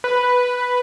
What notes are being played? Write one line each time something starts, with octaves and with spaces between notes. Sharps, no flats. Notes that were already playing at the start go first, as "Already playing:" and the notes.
B4